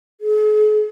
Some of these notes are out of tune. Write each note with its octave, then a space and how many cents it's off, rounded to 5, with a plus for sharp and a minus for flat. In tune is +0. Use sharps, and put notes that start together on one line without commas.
G#4 +45